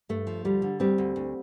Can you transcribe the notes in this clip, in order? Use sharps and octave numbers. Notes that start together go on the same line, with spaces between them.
G2 A3
F3
D2 G3
D3
D2 G3 C4
D2
D2